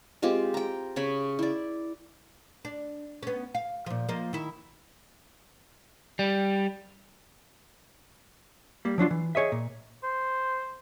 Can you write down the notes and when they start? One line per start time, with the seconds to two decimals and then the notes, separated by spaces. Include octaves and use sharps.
0.22 G#3 C4 F4 G4
0.54 G5 A#5
0.96 C#3 C#5 B5
1.39 E4 D5
2.65 D4
3.23 B3 C#4
3.55 F5
3.86 A#2 F3
4.08 F3 A#3 D#5
4.33 D#3 E4
6.19 G3
8.85 G3 A#3
8.98 F3 F#3 D4 F4
9.11 E3
9.35 G#4 C#5 D#5 E5
9.52 A#2
10.04 C5